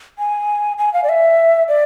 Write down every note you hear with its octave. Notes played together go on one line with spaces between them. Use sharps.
G#5
G#5
F5
D5
E5
D5